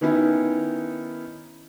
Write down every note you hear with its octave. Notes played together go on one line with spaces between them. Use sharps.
D#3 B3 C#4 D#4 E4